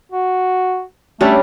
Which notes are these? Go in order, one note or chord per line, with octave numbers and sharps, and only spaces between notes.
F#4
G3 A3 C#4 D4